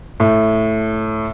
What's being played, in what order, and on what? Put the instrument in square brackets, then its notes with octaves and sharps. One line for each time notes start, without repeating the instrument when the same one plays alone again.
[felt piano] A2